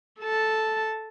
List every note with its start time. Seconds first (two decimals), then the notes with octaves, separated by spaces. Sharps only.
0.20 A4 A5